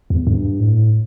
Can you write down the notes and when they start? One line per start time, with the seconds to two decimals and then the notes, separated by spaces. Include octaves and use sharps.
0.10 E2
0.27 G2
0.60 A2